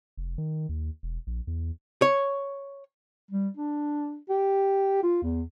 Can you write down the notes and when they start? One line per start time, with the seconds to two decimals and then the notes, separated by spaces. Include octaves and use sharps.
0.17 F1
0.38 D#3
0.69 D#2
1.03 E1
1.27 A#1
1.47 E2
2.02 C#5
3.31 G3
3.57 D4
4.29 G4
5.03 F4
5.23 E2